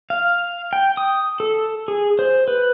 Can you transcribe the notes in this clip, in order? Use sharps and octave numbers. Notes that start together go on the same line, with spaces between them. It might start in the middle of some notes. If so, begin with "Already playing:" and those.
F5
G5
D#6
A4
G#4
C5
B4